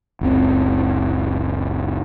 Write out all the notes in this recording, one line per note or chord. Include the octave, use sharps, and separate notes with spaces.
F#1 C#2 C4